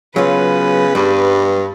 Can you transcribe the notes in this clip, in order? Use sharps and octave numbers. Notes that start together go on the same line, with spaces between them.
C#3 F#3 B3 F4 B4
G2 G3